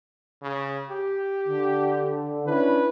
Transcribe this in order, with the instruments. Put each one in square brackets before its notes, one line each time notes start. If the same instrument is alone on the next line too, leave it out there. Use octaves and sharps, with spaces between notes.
[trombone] C#3
G4
[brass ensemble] D3
[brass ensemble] C#4 D4 E4 [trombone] B4